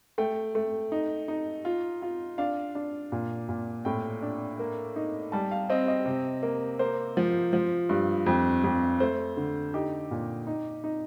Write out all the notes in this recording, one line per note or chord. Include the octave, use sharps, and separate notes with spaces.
A3 G5
A3
D#4
D#4
F4
F4
D4 F5
D4
A#2
A#2
A2 G5
D4
A#3
D#4
G3 A5
F5
C4 D#5
D#5
C3
A#3
A#3 C5
F3
F3
G2
F2
F2
A3 C5
D3
D#4 G4
A#2
D#4
D#4